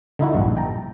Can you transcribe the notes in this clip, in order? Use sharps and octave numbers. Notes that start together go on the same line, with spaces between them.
D3 D#4 E4 F#4
A#1 G2
G5 A5 A#5